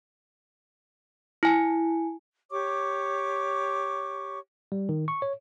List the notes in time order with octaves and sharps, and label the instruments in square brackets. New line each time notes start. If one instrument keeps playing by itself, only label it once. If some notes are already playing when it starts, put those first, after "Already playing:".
[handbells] E4 G#5
[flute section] G4 C#5 C#6 D6
[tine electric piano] G3
D#3
C#6
C#5